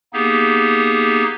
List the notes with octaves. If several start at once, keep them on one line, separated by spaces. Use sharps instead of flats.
A#3 B3 D#4 G4 G#4